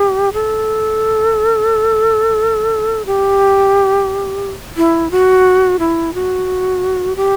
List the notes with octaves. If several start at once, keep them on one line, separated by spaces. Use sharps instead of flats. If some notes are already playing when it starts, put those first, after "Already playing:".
Already playing: G4
A4
G4
E4
F#4
E4
F#4
G4